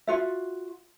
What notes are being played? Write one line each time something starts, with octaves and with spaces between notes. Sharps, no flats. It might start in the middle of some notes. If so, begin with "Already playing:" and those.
F4 F#4 E5